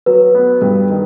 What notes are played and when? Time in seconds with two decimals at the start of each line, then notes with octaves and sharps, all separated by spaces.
0.06 F#3 B4
0.34 B3
0.62 G2
0.90 D#3